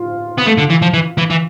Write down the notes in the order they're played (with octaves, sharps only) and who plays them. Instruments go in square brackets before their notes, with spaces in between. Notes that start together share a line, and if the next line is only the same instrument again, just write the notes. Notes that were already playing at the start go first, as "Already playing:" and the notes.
Already playing: [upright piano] F4
[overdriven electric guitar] B3
A3
D3
E3
F3
E3
E3
E3